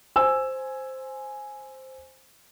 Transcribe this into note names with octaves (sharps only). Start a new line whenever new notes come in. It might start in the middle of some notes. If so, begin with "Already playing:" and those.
C5 G#5 E6